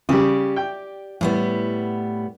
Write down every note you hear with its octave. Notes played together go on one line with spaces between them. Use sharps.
C#3 G3 G4 D5
G5
A2 G3 B3